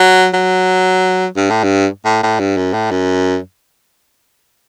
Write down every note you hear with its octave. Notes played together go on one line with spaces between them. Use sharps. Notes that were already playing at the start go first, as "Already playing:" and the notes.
Already playing: F#3
F#3
G2
A2
G2
A2
A2
G2
F#2
A2
F#2